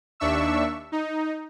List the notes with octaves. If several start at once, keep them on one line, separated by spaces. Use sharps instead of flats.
D#2 D4 E5 C#6 E6
D#4